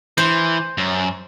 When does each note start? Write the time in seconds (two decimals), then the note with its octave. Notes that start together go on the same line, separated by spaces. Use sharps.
0.18 E3 C5
0.78 F#2